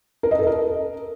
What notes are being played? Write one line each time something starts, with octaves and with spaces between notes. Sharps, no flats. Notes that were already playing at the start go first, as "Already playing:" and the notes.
A#4
D#5
A4
A#4